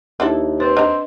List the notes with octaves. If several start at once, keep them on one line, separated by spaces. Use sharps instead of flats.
D#2 D4 E4 A4
C4 B4
D4 D#5 A#5